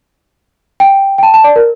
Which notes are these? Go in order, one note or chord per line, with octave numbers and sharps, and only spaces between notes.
G5
G5
A5
A5
D5
A#4